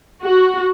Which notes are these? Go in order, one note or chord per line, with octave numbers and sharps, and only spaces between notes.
F#4